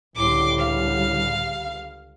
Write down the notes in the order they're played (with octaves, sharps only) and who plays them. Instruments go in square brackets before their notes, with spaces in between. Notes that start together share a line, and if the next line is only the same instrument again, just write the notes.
[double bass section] C#2 D3 G3 [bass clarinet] A2 [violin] C6 D6
[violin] F5